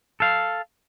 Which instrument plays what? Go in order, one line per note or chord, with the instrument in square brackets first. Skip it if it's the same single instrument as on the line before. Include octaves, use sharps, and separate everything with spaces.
[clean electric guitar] A4 F5